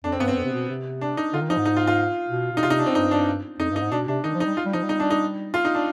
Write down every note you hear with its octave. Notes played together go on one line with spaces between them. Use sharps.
F2 D4
C4
G2 B3
C4
F2
C3
B2
C3
D4
D#4
D3 F4
D#3
F3 D#4
G#2
D#4
F4
F4
B2
B2 D#4
C3 F4
D#4
D4
C4
G2 D#4
D4
F2 D#4
G2
D#4
G#2
B2 D4
C3 D4
D#3 D#4
F3
D#4
G3
F4
G3
F3 D#4
G3
D#4
D4
D#4
F4
D#4
D4